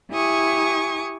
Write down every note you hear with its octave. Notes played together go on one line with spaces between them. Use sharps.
E4 G4 G#5 C#6 D#6